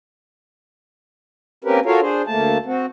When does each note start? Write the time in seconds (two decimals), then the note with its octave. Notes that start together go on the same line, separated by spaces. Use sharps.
1.64 A#3 C4 C#4 G4 A#4 B4
1.86 F4 F#4 A4 A#4 C#5 F5
2.01 D4 G#4 C5
2.27 D2 A3 A#3 A5
2.66 C4 F#4